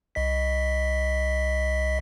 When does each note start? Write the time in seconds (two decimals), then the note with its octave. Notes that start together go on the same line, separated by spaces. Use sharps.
0.15 C2 D#5 B6